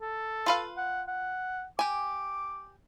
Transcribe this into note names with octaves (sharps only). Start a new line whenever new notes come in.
A4
F4 B4 F5
F#5
F#5
G4 G#5 D6